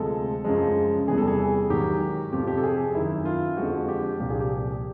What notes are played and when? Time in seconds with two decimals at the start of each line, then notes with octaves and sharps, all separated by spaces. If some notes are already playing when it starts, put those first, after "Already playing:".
Already playing: D2 C3 F3 G#3 A4
0.44 F#2 C#3 F3 G#3
1.08 E2 C3 E3 G3 G#4
1.18 A4
1.28 G#4
1.70 G#2 D#3 F#3 G4
2.32 F2 C3 F3 G4
2.47 G4
2.57 A4
2.64 G#4
2.95 F#2 D#3 F#3 E4
3.25 F4
3.57 F2 D3 F3 G#3 F#4
3.88 G4
4.20 C2 A#2 F3 G4
4.30 G#4
4.41 G4